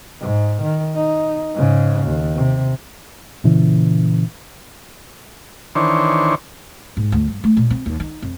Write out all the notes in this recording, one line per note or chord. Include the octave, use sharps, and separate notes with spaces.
G#2
D#3
D#4
G#2 C#3
D#2
C3
A#2 C#3 E3
D#3 E3 D4 C5 C#5
G#2
D2
G2
A3
A#2
C4
D#2
D#4
F2